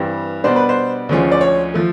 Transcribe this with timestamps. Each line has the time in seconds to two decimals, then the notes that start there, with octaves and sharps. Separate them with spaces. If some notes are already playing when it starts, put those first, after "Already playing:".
Already playing: G2 E3 G3 C4
0.44 B2 G3 B3 D4 C5
0.56 B4
0.69 C5
1.09 D2 D3 F3 G#3 C#4
1.32 D5
1.41 C#5
1.74 F3 A3